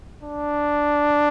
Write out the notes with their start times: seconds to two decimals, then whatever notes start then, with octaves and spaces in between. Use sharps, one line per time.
0.24 D4